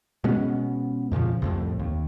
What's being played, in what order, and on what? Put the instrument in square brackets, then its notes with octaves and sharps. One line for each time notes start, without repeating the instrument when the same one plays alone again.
[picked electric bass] B2 G#3 B3 C#4
F2 A#2 C#3 F3
C2 F2 A2
D#2